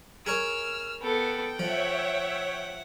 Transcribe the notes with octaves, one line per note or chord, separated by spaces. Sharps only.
G#4 A#4 C#5 E6 F6
B3 A4 G5
F3 C#5 E5 F#5